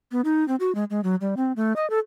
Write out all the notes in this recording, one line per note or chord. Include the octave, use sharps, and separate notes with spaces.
B3
D#4
C4
F#4
G#3
G#3
F#3
G3
C4
A3
D#5
A4